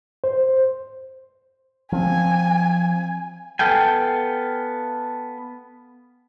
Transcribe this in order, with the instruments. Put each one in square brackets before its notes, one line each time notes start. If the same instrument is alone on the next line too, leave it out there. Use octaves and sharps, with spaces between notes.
[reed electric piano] C5
[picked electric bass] F3 C4 [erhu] G#5
[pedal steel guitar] B3 A4 F5 G5 G#5